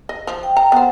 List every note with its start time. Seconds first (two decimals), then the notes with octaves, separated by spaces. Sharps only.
0.09 D#5
0.27 F3
0.43 G5
0.57 A#5
0.72 B3 C5 F#5